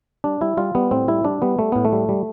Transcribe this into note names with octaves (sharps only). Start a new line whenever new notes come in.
G3 D4
G3 E4
G3 F4
G3 B3
A2 C4
G3 E4
G3 D4
G3 B3
G3 A3
A2 B3
A3
G3
G3